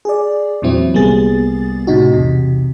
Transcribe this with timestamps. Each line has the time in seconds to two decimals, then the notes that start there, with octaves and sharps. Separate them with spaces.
0.05 G#4 D5
0.62 E2 A#2 E3 F#3 C4 E4
0.94 C2 G3 A#3 B3 G#4 A6
1.87 A2 C3 D#4 F#4
2.12 B1 E2 C3